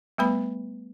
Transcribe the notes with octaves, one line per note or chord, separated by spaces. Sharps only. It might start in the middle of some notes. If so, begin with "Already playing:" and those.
G3 A3 B3 B4 B5